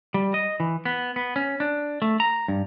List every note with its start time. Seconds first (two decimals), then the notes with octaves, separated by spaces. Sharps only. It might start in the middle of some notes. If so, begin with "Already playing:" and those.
0.14 G3
0.34 D#5
0.60 E3
0.85 B3
1.16 B3
1.36 C#4
1.60 D4
2.02 A3
2.20 A#5
2.48 G2